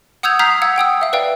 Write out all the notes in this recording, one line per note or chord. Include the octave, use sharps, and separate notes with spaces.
F#5 D#6 E6 G6 G#6 F7
A#5 D#6 F6 G6 B6 C7
F5 F#5 E6 G#6
F#5 G5 D#6 E6
E5 F5
B4 D5 F5 G5